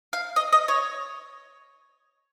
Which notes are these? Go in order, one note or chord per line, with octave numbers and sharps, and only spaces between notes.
F5
D#5
D#5
C#5